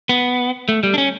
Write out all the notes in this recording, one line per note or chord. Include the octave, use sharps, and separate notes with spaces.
B3
A3
G3
D4
C#4